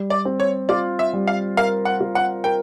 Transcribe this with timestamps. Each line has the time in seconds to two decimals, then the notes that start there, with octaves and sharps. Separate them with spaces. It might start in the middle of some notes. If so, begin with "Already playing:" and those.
Already playing: G3
0.10 D5
0.25 C4
0.40 C#5
0.69 F4 D5
0.99 E5
1.13 G3
1.27 F5
1.57 A#4 F5
1.85 F#5
2.00 F4
2.15 F#5
2.44 A#4 G5